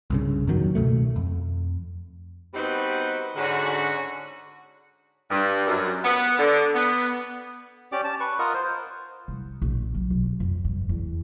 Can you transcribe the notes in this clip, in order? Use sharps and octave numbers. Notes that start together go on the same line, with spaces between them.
C2 G2 C#3
F2 A#2 D#3 F#3
C#2 B2 A3
F2
G3 B3 C4 D#4 F#4 B4
G#2 D3 C#4 D4 F#4
G2
F#2
B3
D3
B3
C#4 G4 D5 D6
A5
B4 C#6
F4 A#4 D#5 F#5
C5
C2
A#1
F#3
B1
C#3
F2
G2
E2